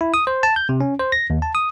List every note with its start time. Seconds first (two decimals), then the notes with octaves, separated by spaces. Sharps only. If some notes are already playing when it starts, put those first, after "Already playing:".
0.01 E4
0.14 D#6
0.27 C5
0.43 A5
0.56 G6
0.69 C3
0.81 C#4
0.99 C5
1.12 A#6
1.30 D#2
1.42 A5
1.55 D#6